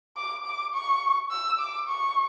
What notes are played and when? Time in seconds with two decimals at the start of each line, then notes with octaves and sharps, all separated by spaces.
0.17 D6
0.45 D6
0.74 C#6
1.31 E6
1.59 D6
1.87 C#6